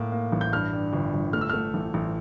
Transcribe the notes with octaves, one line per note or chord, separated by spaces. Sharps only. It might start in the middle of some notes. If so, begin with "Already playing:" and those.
Already playing: A2 A#3
A#3
A1
G6
G2 F6
G2
G1
G1
A3 F6
E6
A3 F6
A1
A1